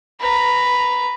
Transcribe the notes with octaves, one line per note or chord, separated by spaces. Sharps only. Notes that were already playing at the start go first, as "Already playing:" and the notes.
B4 A#5